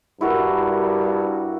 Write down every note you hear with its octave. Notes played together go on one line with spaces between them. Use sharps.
G2 E4 F#4 A#4